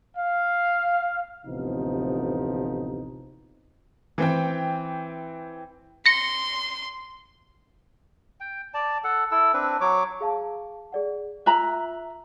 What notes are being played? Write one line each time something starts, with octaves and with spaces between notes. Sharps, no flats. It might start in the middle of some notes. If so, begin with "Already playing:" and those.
F5
A1 D2 C3 F3 B3 D#4
E3 C4 G5
C6 A#6 C#7
G5
D5 A5
A4 F#5
E4 A4 E6
C4 D4 B4
F#3 C#5 D6
G#4 F5 A5
G#4 D5 F#5
F4 E5 A#5 F#6 F#7